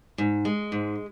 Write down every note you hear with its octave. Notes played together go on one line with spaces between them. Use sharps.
G#2
G#3
G#2